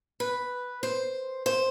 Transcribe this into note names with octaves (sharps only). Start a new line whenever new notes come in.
B4
C5
C5